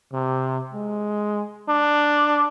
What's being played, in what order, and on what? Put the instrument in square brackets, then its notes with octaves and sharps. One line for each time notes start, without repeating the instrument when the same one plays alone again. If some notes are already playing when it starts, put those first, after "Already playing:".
[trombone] C3
G#3
D4